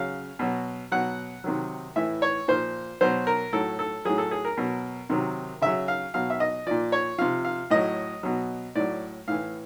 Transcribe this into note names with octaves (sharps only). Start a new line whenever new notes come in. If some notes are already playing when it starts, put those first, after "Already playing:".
Already playing: C#3 F#3 F5
B2 F#3
B2 F#3 F#5
C3 D#3 F#3
A2 E3 E5
C#5
A#2 F3 C5
B2 F#3 C5
A#4
A2 F#3 A4
A4
A2 F#3 G#4
A4
G#4
A#4
B2 F#3
C3 D#3 F#3
C#3 F#3 E5
F5
B2 F#3 F5
E5
D#5
A#2 F3 D5
C#5
C3 F3 F5
F5
A2 F#3 D#5
B2 F#3
A2 F#3 D5
A2 E3 F5